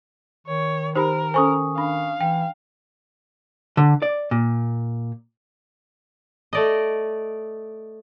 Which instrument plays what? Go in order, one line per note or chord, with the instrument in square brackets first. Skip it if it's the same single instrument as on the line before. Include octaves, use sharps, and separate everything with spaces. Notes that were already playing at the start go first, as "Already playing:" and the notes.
[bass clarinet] D#3 [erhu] C#5
[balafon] D#4 G4 B5 [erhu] A#4 [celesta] C5
[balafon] C#4 A4 C5 [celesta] G#5 C#6 D#6
[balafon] D4 B5 [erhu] F5
[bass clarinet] E3 [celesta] G5
[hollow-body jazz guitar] D3
D5
A#2
[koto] A3 D5 D#5